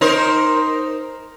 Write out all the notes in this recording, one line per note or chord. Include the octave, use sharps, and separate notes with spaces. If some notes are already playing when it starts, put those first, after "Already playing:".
D#4 A#4 C5